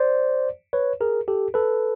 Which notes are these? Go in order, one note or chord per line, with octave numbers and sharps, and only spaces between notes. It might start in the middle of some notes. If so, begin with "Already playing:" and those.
Already playing: C5 D5
B4 C#5
G#4 A#4
G4 A4
A4 B4